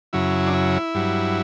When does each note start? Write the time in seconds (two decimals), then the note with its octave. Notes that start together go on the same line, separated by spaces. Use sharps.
0.13 F#2 C#3 F#3 E4
0.47 D4
0.54 E4
0.95 G2 F#3